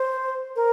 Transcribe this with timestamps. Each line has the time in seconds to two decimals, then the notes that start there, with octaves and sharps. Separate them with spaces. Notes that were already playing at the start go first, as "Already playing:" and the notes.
Already playing: C5
0.56 A#4